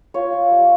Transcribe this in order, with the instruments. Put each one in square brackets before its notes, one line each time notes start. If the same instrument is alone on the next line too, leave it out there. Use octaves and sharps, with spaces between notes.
[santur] F4 C#5
F4
G3